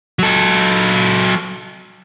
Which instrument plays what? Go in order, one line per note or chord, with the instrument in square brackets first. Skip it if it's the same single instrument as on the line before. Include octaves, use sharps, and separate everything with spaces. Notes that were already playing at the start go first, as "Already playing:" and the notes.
[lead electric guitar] F#3 A4